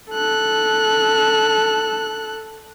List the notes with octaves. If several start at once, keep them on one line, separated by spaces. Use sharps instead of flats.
A4 F#6